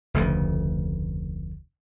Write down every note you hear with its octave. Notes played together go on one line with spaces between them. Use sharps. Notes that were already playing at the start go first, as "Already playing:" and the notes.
F1 D2 C#3